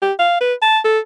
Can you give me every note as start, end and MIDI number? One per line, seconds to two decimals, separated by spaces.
0.02 0.13 67
0.19 0.40 77
0.41 0.54 71
0.62 0.79 81
0.84 0.99 69